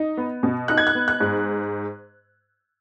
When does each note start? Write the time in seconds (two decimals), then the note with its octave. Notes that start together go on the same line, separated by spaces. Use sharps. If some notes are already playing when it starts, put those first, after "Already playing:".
Already playing: D#4
0.17 B3
0.43 B2
0.68 D#4 F#6
0.78 G#6
0.87 F#6
0.95 B3
1.08 F#6
1.20 G#2